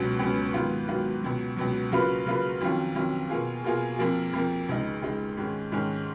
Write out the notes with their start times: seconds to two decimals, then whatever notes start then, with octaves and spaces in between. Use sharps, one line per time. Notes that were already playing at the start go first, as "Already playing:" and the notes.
Already playing: C#2 B2 F#3 C#4
0.19 C#2 B2 F#3 C#4
0.54 G#2 D#3 F#3 B3 F4
0.88 G#2 D#3 F#3 B3 F4
1.23 C#2 B2 F#3
1.57 C#2 B2 F#3
1.92 C#3 F#3 A#3 F4 B4
2.26 C#3 F#3 A#3 F4 B4
2.61 F2 D#3 F#3 C#4 F4
2.95 F2 D#3 F#3 C#4 F4
3.29 B2 A#3 F4 G#4
3.64 B2 A#3 F4 G#4
3.99 F2 F3 A#3
4.33 F2 F3 A#3
4.69 C#2 C#3 G#3 D#4
5.02 C#2 C#3 G#3 D#4
5.37 G#2 D#3 G#3 C#4
5.72 G#2 D#3 G#3 C#4